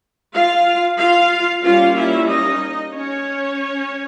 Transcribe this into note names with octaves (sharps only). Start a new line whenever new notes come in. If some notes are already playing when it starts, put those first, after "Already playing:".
F4 F5
F4 F5
G3 A#3 C#4 F4 F5
E4 E5
D#4 D#5
C#4 C#5